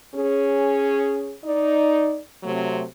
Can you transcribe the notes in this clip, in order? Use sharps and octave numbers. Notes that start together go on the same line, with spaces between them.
C#4 G#4
D#4 D5
C3 F#3 A3 C4